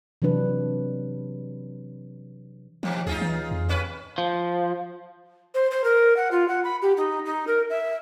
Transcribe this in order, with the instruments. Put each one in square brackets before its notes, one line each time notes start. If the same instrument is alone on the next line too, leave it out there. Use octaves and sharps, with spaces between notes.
[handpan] C3 E3 F#3 D4 B4
[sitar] D#2 B2 [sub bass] F3
[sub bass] D2 [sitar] D#4 F4 G#4
[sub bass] E3
F2
[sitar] D#2 C#4 B4
[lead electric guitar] F3
[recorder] C5
C5
A#4
F#5
F4
F#5
B5
G4
D#4
D#4
A#4
E5